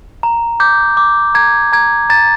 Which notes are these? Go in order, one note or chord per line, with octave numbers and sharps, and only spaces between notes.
A#5
D6 G6
D6
A#5 G#6
A#5 G#6
A#5 A6